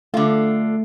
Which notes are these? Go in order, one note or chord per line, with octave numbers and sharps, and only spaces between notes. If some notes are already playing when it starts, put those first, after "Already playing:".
D3 A3 F4